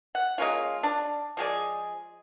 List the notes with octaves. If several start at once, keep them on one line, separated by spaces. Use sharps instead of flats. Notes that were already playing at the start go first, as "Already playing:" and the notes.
F#5
G#3 A#3 C#4 F4
D4
F3 G#3 G#4 D5